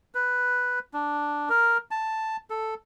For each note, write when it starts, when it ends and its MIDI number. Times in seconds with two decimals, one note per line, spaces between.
0.15 0.79 71
0.94 1.49 62
1.49 1.78 70
1.91 2.37 81
2.50 2.74 69